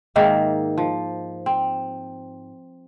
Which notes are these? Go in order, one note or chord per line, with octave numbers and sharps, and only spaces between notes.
G#2 D#3 A#3 E5
F3
C4